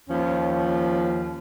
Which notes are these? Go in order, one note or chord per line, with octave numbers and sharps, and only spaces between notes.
D#2 F3 C#4